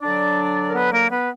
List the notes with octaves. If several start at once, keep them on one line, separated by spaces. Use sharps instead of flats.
D3 F#3 D4 D5
A#4
B3 B4
A#3 A#4
B3 B4